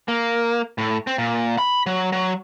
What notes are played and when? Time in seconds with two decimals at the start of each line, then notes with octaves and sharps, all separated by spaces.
0.08 A#3
0.78 A2
1.07 C4
1.18 A#2
1.58 B5
1.86 F#3
2.12 F#3